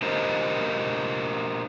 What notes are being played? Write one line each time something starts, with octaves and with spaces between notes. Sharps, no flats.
D4 G4 A#4 C5 D#5